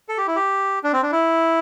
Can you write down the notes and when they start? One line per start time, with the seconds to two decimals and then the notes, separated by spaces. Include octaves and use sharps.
0.09 A4
0.18 G4
0.27 E4
0.36 G4
0.84 D4
0.93 C4
1.03 D4
1.12 E4